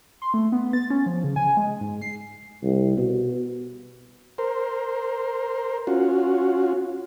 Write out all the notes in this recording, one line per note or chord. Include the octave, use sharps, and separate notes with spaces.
C6
A3
B3
A6
C#4
F3
C#3
G#5
G#3
G#2
C7
C2
B2
A#4 C5
C#4 F4 F#4